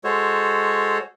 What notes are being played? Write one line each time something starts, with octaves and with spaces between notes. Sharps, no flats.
G#3 F#4 A4 C5 C#5